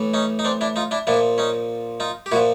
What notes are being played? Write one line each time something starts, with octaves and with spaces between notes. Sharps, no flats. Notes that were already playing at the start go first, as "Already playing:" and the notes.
Already playing: A2 E3
C#4 D#4
D#4
C4 D4
D4 E4
D#4 F4
D4 E4
A#2 F3 D4 E4
C#4 D#4
D#4 F4
G4
A#2 F3 E4 F#4